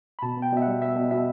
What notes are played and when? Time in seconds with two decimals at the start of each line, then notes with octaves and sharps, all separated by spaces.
0.19 B5
0.22 B2 A5
0.37 B3
0.42 G5
0.52 B2 E5
0.62 G3 F#5
0.82 B3 E5
0.96 B2
1.11 B2 E5